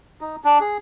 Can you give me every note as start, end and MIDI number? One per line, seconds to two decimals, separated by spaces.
0.21 0.36 63
0.44 0.59 62
0.61 0.78 68